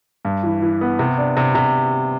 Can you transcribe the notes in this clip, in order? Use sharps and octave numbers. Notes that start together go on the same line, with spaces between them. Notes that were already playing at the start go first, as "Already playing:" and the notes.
G2
E3
E3
B3
C3
D4
C3
C3